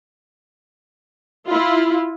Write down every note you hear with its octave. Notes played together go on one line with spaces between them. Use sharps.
E4 F4